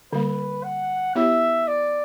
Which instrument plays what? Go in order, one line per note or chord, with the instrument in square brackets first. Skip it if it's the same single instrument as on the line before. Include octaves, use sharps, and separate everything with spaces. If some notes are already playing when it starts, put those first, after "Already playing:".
[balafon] D3 G3 A#3 [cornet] B4
[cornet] F#5
[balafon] B3 E4 G4 C#5 [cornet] E5
[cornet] D5